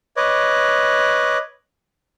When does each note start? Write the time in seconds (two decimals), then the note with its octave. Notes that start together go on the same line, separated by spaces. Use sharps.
0.17 B4 C#5 D#5 D6